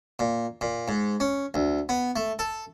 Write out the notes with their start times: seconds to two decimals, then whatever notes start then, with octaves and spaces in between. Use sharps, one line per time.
0.19 A#2
0.61 A#2
0.88 G#2
1.20 C#4
1.54 D2
1.89 B3
2.16 A3
2.39 A4